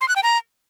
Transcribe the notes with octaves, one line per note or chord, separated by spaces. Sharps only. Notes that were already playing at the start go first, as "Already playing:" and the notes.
C6
F#6
G5
A#5